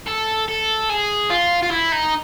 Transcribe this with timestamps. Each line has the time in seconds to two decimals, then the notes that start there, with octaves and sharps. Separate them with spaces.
0.08 A4
0.48 A4
0.90 G#4
1.30 F4
1.63 F4
1.71 E4
1.92 D#4